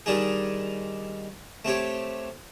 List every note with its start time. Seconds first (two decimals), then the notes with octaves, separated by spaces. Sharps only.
0.06 D#3 G3 D4 D#4 G#4
1.65 A3 C4 G4 C#5